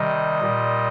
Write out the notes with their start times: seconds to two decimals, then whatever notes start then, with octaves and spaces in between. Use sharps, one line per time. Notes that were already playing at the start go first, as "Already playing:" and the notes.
Already playing: C3 D#3 G3 D#5
0.41 A#2 G3